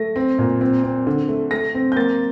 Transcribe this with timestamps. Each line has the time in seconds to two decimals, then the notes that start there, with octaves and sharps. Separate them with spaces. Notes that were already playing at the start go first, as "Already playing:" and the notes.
Already playing: A3 A#6
0.16 C4
0.38 A#2
0.61 C4
0.83 C4
1.07 D3
1.28 A3
1.51 A3 A#6
1.74 C4
1.92 G6
1.96 A#3 A6